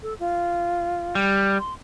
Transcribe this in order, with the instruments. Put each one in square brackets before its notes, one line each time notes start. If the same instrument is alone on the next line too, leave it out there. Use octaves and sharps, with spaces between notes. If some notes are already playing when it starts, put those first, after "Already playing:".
[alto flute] A4
F4
[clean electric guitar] G3
[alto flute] C6